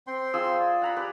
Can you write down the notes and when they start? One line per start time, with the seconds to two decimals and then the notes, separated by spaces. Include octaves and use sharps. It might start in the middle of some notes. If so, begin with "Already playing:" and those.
0.07 C4 G5 C6
0.34 F3 G#4 E6
0.59 D5
0.82 F#5 A#5 B5
0.97 G4 B4